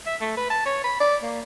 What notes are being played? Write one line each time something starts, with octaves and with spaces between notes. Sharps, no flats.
E5
A3
B4
A5
C#5
B5
D5
A#3